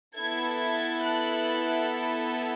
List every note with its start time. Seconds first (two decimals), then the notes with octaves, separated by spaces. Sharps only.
0.16 B3 E4 A4 G#6
0.59 G#6
1.03 F#6